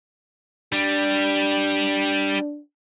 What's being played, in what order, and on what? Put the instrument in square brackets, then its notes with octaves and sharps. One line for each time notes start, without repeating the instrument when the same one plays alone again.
[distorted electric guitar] G3 [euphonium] D4